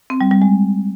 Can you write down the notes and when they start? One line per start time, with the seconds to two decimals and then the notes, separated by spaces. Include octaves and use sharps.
0.10 C4
0.21 G3
0.31 G3
0.42 G#3